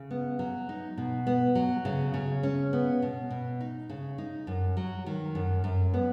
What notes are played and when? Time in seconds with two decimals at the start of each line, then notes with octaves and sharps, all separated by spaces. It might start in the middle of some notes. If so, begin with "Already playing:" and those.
Already playing: C#3
0.11 B3
0.39 F#3
0.69 D#4
0.97 B2
1.27 B3
1.55 F#3
1.85 C#3
2.14 C#3
2.43 C#4
2.73 B3
3.02 B2
3.31 B2
3.61 D#4
3.90 C#3
4.18 D#4
4.47 F#2
4.77 F#3
5.06 D#3
5.35 F#2
5.64 F#2
5.94 B3